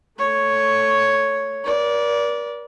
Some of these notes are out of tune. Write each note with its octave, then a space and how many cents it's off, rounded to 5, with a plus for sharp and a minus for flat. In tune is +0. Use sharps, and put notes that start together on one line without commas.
A3 +10 C#5 +0
A#4 +45 D5 -15